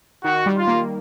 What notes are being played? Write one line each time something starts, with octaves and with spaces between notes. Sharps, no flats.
D#3 F#4
G3
F4
A#3